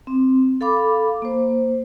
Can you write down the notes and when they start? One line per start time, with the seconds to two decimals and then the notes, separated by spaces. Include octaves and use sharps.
0.07 C4
0.61 A4 F5 B5 D6
1.22 A#3 C5